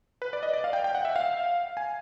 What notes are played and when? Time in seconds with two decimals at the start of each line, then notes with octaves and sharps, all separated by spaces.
0.22 B4
0.33 D5
0.43 D#5
0.53 D5
0.64 F5
0.73 G5
0.84 G5
0.95 F#5
1.05 E5
1.16 F5
1.77 G#5